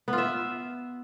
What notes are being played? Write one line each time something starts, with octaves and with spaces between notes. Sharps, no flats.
B3
F4
E5